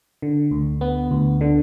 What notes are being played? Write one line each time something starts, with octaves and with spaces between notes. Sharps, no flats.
D3
D2
B3
D2
D3